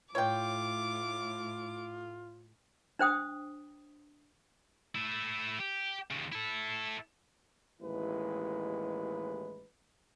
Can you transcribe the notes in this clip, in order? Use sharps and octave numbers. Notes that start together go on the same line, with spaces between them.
A2 F4 C#5 G5 D6
D4 C5 G5 D#6
A3 E4
G4
D#2 C#3
E4 A4
A1 D#2 G#3 E4 B4